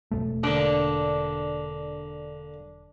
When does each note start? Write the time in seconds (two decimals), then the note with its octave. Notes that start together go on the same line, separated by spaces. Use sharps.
0.11 E1 E2 A3
0.43 D3 A#3 D4